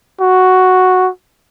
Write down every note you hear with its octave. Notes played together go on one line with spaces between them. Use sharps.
F#4